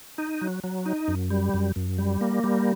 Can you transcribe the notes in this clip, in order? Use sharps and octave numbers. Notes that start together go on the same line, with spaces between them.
D#4
F#3
F#3
D#4
F#2
G3
F#2
F#2
G3
A#3
G3